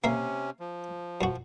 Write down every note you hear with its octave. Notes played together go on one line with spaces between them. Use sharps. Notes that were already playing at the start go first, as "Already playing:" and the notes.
C3 A#3 C#4 E5
F3
F#2 F#4